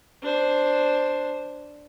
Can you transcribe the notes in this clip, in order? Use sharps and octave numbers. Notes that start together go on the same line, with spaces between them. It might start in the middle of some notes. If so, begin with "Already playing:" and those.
D4 C5